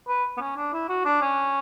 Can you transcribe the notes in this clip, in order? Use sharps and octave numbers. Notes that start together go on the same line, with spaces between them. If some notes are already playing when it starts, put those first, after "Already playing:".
B4
B3
C#4
D4
E4
F#4
D4
C#4